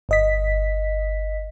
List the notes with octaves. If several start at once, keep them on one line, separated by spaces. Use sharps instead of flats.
G1 D#5 B6